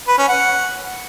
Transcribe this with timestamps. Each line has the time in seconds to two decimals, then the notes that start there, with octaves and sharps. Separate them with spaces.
0.08 B4
0.18 C#4
0.28 F#5